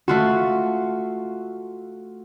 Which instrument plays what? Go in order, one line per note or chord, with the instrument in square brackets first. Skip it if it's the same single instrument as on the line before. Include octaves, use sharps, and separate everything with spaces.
[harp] A3 F4 F#4